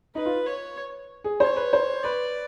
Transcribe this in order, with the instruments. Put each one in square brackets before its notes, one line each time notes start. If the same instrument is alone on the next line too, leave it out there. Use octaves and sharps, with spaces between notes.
[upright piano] D#4 [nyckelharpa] B4
[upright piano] F4
[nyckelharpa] C#5
[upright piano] G#4
[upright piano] C5 [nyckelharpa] C#5
[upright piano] B4
C5
[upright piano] B4 [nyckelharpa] D5